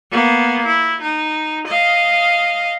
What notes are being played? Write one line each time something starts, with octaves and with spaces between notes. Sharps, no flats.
A#3 B3
E4
D#4
D#5 F5